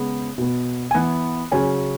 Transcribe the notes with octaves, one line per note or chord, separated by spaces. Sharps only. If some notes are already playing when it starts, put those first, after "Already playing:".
Already playing: C#3 G#3 B3
B2 B3
G#5
E3 B3 F#5
C#3 F#3 C#4 G#5